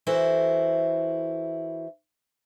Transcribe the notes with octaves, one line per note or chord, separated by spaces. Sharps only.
E3 E4 F#4 A4 C5